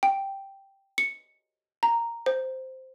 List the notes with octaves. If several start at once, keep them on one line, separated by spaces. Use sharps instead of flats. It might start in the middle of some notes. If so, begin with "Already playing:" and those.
G5
C#7
A#5
C5